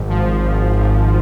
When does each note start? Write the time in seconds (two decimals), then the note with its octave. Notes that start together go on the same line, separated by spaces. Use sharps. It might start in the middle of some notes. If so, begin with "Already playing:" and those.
Already playing: G#1 G#2
0.09 F3
0.44 G#1
0.78 G#1